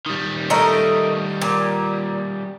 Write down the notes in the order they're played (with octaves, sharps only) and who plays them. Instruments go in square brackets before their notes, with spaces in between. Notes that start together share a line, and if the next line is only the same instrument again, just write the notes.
[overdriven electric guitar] D#3 G3
[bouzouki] A3 A#4 D#5
A#2